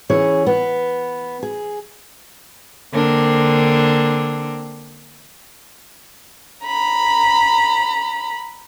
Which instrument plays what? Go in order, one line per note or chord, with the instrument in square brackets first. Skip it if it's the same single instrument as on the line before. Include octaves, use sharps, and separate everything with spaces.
[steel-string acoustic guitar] E3 C#4 G#4 C#5
B3
G#4
[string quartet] D3 A#3 C4 D4
[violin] A#5 B5